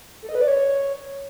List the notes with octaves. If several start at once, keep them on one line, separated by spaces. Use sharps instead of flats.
A4
D#5
B4
D5
C#5